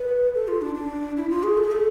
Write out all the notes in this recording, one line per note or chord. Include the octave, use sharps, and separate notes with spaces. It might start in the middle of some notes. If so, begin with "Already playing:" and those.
Already playing: B4
A4
F4
D4
D4
E4
F4
G#4
A4
G#4
A4